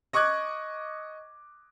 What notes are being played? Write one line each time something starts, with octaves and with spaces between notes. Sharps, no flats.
D#5 C#6 D6 F#6 G#6